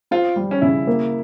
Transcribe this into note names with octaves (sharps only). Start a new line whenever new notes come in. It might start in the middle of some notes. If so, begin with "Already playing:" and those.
C4 F4
G3
C#4
C#3 E4
A#3